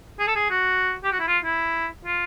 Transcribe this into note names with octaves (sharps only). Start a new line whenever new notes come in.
G#4
A4
G#4
F#4
G4
F#4
E4
F4
E4
F4